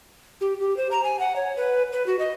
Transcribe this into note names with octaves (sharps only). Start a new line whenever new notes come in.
G4
G4
C5
A#5
G#5
F#5
C#5
B4
B4
F#4
D#5